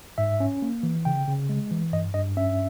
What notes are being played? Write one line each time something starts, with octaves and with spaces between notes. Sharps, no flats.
G#2 E5
C#4
A#3
E3
C#3 G5
C#3
G#3
E3
G2 D#5
G2 D#5
C#4 E5